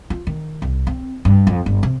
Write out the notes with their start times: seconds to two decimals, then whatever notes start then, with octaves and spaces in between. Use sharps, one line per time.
0.10 F4
0.27 D#3
0.62 C2
0.87 C4
1.25 G2
1.47 F2
1.66 G1
1.83 C3